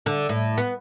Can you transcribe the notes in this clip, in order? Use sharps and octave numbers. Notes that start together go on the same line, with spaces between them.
D3
A2
B3